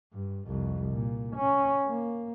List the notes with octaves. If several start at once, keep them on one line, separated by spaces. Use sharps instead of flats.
G2
C2 F2
A#2
C#4
A#3